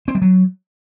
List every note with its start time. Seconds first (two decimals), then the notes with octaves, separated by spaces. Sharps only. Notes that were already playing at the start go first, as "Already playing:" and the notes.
0.08 C4
0.15 G3
0.22 F#3